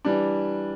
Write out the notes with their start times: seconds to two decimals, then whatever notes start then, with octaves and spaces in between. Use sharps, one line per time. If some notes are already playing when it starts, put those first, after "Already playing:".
0.05 E3 G3 D4